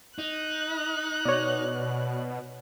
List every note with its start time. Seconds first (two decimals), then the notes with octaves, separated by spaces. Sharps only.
0.19 D#4 F#6
1.25 B2 C#5 D5